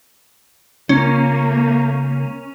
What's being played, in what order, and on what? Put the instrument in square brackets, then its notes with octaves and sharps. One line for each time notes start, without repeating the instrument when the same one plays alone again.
[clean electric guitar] C#2 [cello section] A#3 [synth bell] C#4